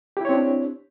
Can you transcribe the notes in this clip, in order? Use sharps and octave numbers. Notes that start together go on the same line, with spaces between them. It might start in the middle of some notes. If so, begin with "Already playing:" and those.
C4 D4 E4 G4 C#5